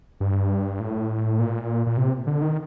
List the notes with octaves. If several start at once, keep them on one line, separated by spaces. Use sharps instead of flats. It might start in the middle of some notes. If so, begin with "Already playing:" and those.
G2
A2
A#2
A#2
C3
D3
D#3